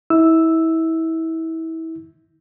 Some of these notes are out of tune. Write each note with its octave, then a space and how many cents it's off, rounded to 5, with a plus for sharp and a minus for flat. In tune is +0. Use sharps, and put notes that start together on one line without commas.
E4 -30 E6 +0